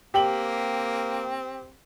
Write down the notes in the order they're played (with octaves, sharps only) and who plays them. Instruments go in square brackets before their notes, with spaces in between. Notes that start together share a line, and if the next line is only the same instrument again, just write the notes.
[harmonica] A#3 [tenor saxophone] C4 [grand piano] G4 G5 F#7